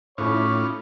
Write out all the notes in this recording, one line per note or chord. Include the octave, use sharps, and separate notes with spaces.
A2 C#4 D#4 F4 C#5 B5 C#6 D6